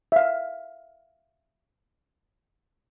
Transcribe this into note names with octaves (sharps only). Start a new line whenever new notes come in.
E5 F5